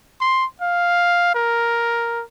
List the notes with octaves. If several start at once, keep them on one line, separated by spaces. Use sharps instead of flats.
C6
F5
A#4